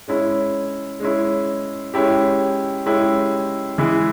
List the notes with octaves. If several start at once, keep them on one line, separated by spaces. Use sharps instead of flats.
G#3 C#4 E4
G#3 C#4 E4
G#3 C#4 E4 G4
G#3 C#4 E4 G4
E3 G#3 E4 G#4